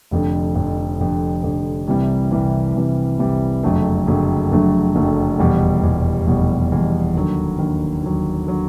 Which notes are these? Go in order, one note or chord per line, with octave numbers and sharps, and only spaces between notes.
F1 F2 D3
F1 F2 D3
F1 F2 D3
F1 F2 D3
C2 C3 E3 G3
C2 C3 E3 G3
C2 C3 E3 G3
C2 C3 E3 G3
F#1 F2 D3 F#3 A3
F#1 F2 D3 F#3 A3
F#1 F2 D3 F#3 A3
F#1 F2 D3 F#3 A3
F1 E2 B2 G3
F1 E2 B2 G3
F1 E2 B2 G3
F1 E2 B2 G3
D#2 D3 F#3
D#2 D3 F#3
D#2 D3 F#3
D3 F#3